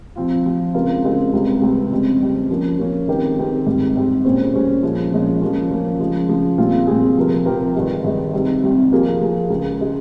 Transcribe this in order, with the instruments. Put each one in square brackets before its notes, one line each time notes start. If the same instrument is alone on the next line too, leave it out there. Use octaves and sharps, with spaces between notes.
[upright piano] F3 C4 F4
F3 C4 F4
C#3 G#3 C4 F4 A#4
C#3 G#3 C4 F4 A#4
C#2 C3 G3 C4
C#2 C3 G3 C4
F2 C#3 G3 C4
F2 C#3 G3 C4
F3 A#3 C#4
F3 A#3 C#4
D#3 G#3 C4 G4 A#4
D#3 G#3 C4 G4 A#4
G#2 G3 C4
G#2 G3 C4
A#2 G3 C#4 G#4 C5
A#2 G3 C#4 G#4 C5
A#2 F3 G#3 C#4
A#2 F3 G#3 C#4
F3 A#3 C#4
F3 A#3 C#4
C#3 F3 G#3
C#3 F3 G#3
A#2 G3 C4 F4 G#4
A#2 G3 C4 F4 G#4
C3 F3 C4 G4 A#4
C3 F3 C4 G4 A#4
G2 D#3 G#3 D#4
G2 D#3 G#3 D#4
C2 C3 G3 C4 D#4
C2 C3 G3 C4 D#4
F3 A#3 F4 G#4
F3 A#3 F4 G#4
C#2 C#3 G#3
C#3 G#3